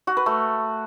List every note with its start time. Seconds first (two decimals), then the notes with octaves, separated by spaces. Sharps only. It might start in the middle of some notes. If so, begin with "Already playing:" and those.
0.07 F#4
0.17 B4
0.26 A3